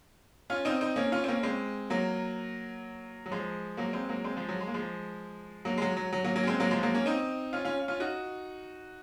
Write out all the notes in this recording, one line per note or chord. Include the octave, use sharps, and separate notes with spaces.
C#4 F4
C4 D#4
C4 D#4
A#3 C#4
C#4 F4
C4
A#3 C#4
G#3 C4
F#3 A#3
F#3
F3 G#3
F#3 A#3
G#3 C4
F#3 A#3
G#3 C4
F3 G#3
F#3
G#3
A#3
F3 G#3
F#3 A#3
G#3
F#3
F#3
F#3
F#3 A#3
F#3 A#3
C#4
G#3 C4
F#3 A#3
F3 G#3
F#3 A#3
A#3 C#4
C4 D#4
C#4 F4
C#4 F4
C#4 F4
D#4 F#4